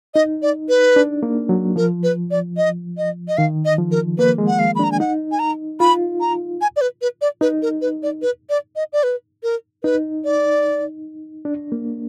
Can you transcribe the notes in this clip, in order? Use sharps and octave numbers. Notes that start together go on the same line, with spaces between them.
D#4 D#5
D5
B4
D4
A#3
F#3
F3 A#4
B4
D5
D#5
D#5
D#5
D#3 F5
D#5
F3
A#4
A#3 B4
G#3
F#5
F5
B5
D4
A#5
G#5
D#4 F#5
G#5
A#5
F4 B5
A#5
G#5
D5
B4
B4
D5
D#4 B4
A#4
B4
D5
B4
D5
D#5
D5
B4
A#4
D#4 B4
D5
D4
A#3